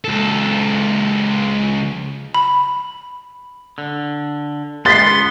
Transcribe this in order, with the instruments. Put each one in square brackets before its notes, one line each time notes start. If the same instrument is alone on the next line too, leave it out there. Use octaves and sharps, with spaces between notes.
[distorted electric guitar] C#2 A4
[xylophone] B5
[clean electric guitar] D3
[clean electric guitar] C#2 B3 [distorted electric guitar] C6 [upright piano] A6 B6 C7